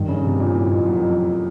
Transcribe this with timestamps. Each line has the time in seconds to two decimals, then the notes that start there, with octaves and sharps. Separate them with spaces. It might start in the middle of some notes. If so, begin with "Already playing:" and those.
Already playing: G2 D#3
0.08 C#3
0.24 C3
0.40 A#2
0.55 A2
0.71 F2
0.86 F#2
1.02 F2